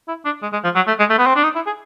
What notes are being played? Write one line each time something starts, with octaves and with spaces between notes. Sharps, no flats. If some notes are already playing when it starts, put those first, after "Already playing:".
E4
D4
G#3
G#3
F3
F#3
A3
G#3
A3
B3
C4
D4
D#4
E4
G#4